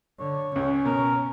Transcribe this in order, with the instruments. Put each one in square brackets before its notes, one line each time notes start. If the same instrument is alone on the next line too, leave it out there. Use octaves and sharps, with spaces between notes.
[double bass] D3 [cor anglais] C#5
[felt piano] C#2 [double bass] C#4
[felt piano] B2 [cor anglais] A#4